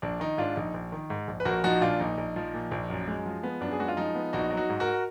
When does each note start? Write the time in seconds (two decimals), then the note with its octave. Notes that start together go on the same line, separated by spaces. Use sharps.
0.02 A#1 D4
0.20 D#3 D#4
0.38 G#2 D4 F4
0.56 A#1 D#4
0.74 A#1
0.92 D#3
1.10 G#2
1.28 A#1
1.40 B4
1.45 A#1 F#4 A#4
1.64 F3 D#4 F#4
1.81 A#2 D4 F4
2.00 A#1 D#4
2.18 A#1
2.36 F3
2.54 A#2
2.71 A#1
2.90 F#2
3.08 G#3
3.26 F3
3.43 B3
3.61 F#2 D4
3.71 G#4
3.79 G#3 F#4
3.88 F4
3.97 F3 D#4
4.15 B3
4.33 A#1 D#4 F#4
4.50 F#3
4.57 D#4 F#4
4.69 G#2
4.80 F#4 A#4